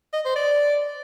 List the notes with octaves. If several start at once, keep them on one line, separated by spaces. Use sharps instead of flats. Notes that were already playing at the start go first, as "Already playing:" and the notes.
D#5
C5
D5